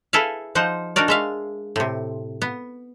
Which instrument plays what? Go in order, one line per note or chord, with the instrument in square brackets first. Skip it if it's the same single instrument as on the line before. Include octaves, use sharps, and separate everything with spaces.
[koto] E4 G#4 A4 B4 E5 F5
F3 D#4 C5 F#5
D4 D#4 F#4 A#4 D5
G#3 E5 F5
A2 C3
B3